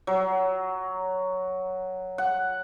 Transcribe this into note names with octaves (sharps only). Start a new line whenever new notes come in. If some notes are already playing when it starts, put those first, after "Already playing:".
F#3
F#5